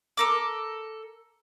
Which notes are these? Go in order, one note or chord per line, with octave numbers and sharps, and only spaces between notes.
A4 A#4 D6